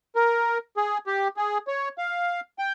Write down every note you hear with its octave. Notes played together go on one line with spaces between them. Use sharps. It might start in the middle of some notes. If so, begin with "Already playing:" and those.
A#4
G#4
G4
G#4
C#5
F5
G5